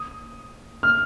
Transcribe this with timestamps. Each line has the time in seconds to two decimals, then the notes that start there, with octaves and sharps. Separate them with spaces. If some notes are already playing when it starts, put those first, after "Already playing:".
Already playing: D#6
0.83 F6